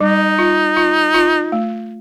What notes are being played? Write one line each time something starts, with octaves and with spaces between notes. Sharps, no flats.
G3 D#4
F4
F4
F4
A3